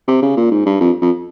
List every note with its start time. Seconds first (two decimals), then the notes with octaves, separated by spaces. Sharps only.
0.08 C3
0.22 C#3
0.37 A#2
0.51 G#2
0.66 G2
0.80 F2
1.01 F2